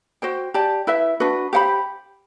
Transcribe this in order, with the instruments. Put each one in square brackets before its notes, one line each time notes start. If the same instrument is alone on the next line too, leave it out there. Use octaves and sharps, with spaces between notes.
[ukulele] F#4 C5 G5
G4 D5 A5
E4 B4 E5
D4 F#4 B4
G4 C5 F#5 B5